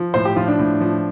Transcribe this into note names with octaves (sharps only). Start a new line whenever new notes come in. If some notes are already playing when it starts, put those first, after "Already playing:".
Already playing: F3
A2 C5
G4
F3 F4
D4
A2
F3